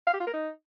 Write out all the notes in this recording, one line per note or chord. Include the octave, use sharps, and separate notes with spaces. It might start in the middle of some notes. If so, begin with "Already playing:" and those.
F5
G4
F4
A#4
D#4